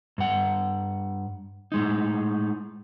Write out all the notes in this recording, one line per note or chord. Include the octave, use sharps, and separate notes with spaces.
G2 F#5
A2 G#3 D#4